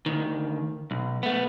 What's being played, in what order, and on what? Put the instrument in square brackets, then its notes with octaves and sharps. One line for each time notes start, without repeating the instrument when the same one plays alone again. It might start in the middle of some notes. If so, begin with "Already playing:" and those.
[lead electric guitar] D2 D#3
B1
A3 B3